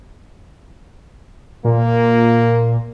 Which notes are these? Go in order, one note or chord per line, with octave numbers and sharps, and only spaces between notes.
A#2 A#3